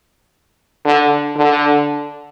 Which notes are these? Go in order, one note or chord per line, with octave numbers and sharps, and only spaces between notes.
D3
D3